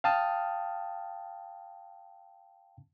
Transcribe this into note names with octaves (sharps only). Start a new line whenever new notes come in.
F5 G5 A5 D#6 F6